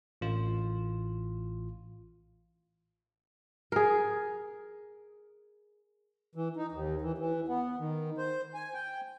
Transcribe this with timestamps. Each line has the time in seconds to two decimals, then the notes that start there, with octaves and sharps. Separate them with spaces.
0.21 A1 F4
3.72 G#4 A#4
6.35 E3
6.57 D#4
6.72 D#2
7.01 E3
7.18 E3
7.48 B3
7.78 D#3
8.18 C5
8.54 G#5
8.74 G5